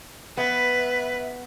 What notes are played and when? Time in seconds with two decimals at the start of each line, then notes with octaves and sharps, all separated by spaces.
0.37 B3 B4 E5